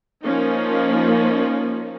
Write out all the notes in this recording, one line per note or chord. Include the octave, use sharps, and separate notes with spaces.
F3 A#3 C#4 D#4